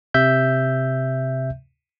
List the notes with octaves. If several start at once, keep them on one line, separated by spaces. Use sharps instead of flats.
C3 E5 G6